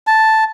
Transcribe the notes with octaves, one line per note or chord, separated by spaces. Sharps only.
A5